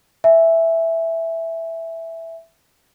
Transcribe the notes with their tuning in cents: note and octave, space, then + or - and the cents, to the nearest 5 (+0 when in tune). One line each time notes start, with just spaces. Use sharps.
E5 +0 G#5 +0